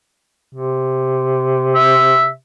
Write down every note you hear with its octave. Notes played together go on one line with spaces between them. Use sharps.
C3
E5